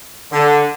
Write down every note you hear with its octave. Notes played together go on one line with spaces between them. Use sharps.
D3